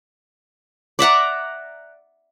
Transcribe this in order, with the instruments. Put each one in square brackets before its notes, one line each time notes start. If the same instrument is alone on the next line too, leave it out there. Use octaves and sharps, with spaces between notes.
[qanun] D5 E5 F#5 A#5